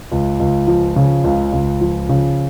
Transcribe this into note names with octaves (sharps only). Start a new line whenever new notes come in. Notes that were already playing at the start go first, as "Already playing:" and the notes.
C#2
C#2
F3
C#3
C#2
C#2
F3
C#3